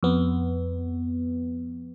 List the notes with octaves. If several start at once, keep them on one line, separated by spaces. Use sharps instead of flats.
F2 B3